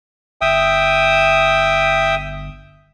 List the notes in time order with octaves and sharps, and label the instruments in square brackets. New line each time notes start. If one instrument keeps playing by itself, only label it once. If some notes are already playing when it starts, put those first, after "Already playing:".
[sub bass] G1 [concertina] E5 G5 D#6